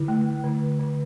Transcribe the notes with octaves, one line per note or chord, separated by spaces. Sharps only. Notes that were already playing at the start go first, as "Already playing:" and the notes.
Already playing: D3 E4
A3
D3
D3